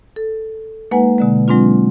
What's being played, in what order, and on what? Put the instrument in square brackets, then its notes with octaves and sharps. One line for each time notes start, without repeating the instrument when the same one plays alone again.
[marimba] A4
G#3 A#3 D#4 B4 F#5 G#5
B2 D3 G#3
F#3 G#3 C4 D4 F4